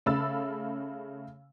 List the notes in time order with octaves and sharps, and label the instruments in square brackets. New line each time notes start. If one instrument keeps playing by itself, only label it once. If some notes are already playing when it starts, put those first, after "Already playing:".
[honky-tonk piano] C#3 A3 B5 E6 A6